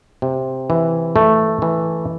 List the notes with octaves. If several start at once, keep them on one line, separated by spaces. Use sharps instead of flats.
C3
E3
A3
E3